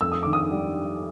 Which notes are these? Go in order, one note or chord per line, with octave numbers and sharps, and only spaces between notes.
F2 E6
D#6
D#3 D6
D#6
G3